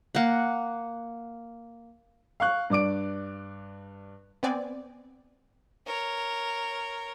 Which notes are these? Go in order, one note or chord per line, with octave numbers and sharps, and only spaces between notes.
A#3 F#5
F5 C#6 F#6
G2 D5 D6 D7
B3 C4 D5 G#5
A#4 C#5